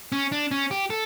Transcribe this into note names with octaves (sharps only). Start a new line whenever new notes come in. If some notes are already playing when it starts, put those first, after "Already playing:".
C#4
D4
C#4
G4
A4